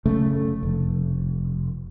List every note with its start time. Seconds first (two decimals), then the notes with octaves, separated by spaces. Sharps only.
0.06 F#1 C#3 A3
0.63 F1